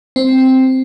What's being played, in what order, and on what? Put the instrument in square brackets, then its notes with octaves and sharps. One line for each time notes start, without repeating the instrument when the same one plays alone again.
[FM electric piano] C4